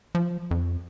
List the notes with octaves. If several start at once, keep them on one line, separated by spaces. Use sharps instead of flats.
F3
F2